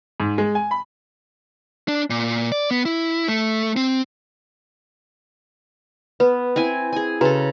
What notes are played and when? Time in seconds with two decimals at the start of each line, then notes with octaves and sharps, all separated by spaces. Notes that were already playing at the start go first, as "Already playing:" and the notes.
0.20 G#2
0.38 G#3
0.55 G#5
0.71 B5
1.88 D4
2.10 A#2
2.52 D5
2.71 B3
2.85 E4
3.28 A3
3.77 C4
6.20 B3 B4
6.56 C4 E4 G#5
6.93 G#4 G#5
7.21 C#3 F#4 A4 B4 A#5